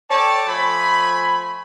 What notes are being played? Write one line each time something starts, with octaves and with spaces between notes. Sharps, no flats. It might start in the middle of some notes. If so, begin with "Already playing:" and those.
A4 C#5 D5 G5 A5
F3 A3 G#5 B5